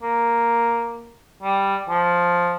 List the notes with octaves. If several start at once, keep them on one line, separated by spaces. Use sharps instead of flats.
A#3
G3
F3